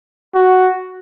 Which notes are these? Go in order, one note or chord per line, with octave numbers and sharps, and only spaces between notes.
F#4